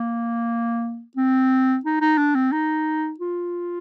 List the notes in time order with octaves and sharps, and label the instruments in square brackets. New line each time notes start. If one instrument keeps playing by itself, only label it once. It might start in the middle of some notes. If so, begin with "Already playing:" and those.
Already playing: [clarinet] A#3
C4
D#4
D#4
D4
C4
D#4
F4